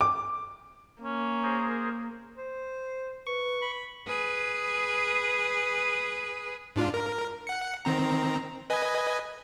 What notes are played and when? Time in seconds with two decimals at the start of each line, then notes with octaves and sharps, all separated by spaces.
0.01 D6
1.02 A#3 C#4
1.43 G#4 A#4 C5
2.38 C5
3.27 B4 C#6
3.62 B5
4.07 G#4 B4
6.76 G#2 D4 F4
6.94 A#4
7.47 F#5 C#7
7.85 D#3 C4 A#5
8.70 B4 D#5 G#5